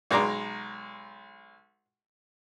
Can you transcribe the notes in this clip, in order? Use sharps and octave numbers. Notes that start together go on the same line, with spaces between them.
B1 G#3 D5 A#5 C6